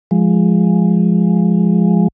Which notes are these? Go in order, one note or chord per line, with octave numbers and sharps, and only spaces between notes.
F3 G#3